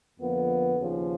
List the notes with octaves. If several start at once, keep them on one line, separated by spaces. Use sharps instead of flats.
F2 D3 F3 A#3 B3
D#2 C#3 F3